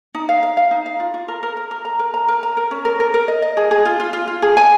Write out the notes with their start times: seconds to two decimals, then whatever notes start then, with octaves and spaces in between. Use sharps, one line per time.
0.15 D#4
0.29 F5
0.43 F5
0.57 F5
0.71 D#4
0.86 F5
1.00 F4
1.14 F4
1.28 A#4
1.43 A#4
1.57 A#4
1.71 A#4
1.85 A#5
1.99 A#4
2.14 A#5
2.28 A#4
2.43 A#5
2.57 A#4
2.71 C#4
2.85 A#4
3.00 A#4
3.14 A#4
3.28 D#5
3.42 D#5
3.57 G#4
3.71 G#4
3.85 F4
4.00 F4
4.13 F4
4.28 F4
4.42 G#4
4.57 G#5